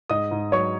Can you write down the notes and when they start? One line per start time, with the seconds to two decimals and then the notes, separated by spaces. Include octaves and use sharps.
0.10 G#2 D#5 D#6
0.31 G#2
0.52 F#3 C#5 C#6